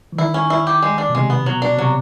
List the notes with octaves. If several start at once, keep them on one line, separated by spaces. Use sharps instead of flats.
E3
D#3 E4
C#4
E4
G4
G#3
D4
B2
C3 G#3
B3
B2 F#3
D4
C3 F#3